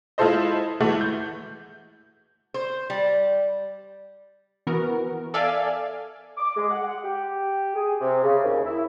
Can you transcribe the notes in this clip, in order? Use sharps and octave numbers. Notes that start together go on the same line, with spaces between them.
G#3 E4 F4 A4 C5 D#5
E3 G#3 A3 E4 F#4
G6
C5
G3
E3 B3 F#4 A#4
A4 D5 E5 F5 G#5
D6
G#3
F#5
F#5
G4
G#4
C3
C#3
D#2
E4